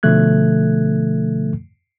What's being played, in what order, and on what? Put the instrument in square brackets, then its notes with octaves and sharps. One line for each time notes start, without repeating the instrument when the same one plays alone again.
[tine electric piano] B2 D3 F3 A3 F#6 G#6